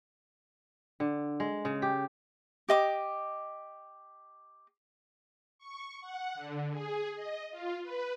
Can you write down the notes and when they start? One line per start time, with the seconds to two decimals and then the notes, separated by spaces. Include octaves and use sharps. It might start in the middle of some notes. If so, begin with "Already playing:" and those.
1.00 D3
1.40 G#3
1.65 C#3
1.82 G4
2.69 G4 D#5 D6
5.59 C#6
6.01 F#5
6.35 D3
6.71 G#4
7.15 D#5
7.51 F4
7.83 B4